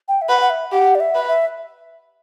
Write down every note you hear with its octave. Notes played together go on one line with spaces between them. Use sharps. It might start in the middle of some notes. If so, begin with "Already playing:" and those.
G5
E5
B4 F#5
F#5
E5
G4 F#5
D5
E5
B4
E5